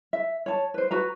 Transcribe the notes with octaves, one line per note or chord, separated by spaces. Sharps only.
E5
C#5 A5
B4 C5
F#4 B4 A#5